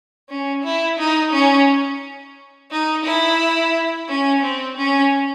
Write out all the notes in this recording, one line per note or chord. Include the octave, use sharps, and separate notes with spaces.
C#4
E4
D#4
C#4
D#4
E4
C#4
C4
C#4